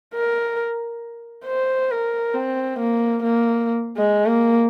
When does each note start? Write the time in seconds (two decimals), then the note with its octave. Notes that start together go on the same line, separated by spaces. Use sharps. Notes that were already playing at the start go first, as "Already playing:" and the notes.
0.14 A#4
1.46 C5
1.91 A#4
2.34 C4
2.79 A#3
3.24 A#3
3.97 G#3
4.26 A#3